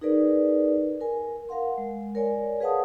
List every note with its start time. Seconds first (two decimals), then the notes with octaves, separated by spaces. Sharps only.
0.01 D#4 G#4 A#4 B4 D5
1.01 A#4 G#5
1.49 A#4 F5 F#5 C6
1.78 G#3
2.15 A#4 C#5 D5 G#5
2.60 G#4 B4 F5 F#5 A5 D#6